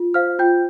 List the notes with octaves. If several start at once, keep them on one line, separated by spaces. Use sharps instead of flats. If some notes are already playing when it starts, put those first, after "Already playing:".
Already playing: F4
C5 F5 F6
F4 G5 G6